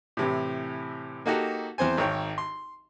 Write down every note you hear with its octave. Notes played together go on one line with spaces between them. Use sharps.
A2 C3 E3
A#3 D#4 F#4 G4 A4 F#5
E2 C4 C5 G#5
G#1 D#3 C#5 G5
C6